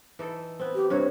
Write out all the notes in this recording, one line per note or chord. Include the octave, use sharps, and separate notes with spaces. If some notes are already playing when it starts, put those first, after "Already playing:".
E3 D#4 A4
B3 C4
G4
G2 C3 F#4 C#5